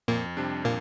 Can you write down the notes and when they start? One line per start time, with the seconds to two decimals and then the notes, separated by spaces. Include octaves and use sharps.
0.08 F2 A#2 A#3
0.37 C3 G3 D4
0.65 A#2 A#3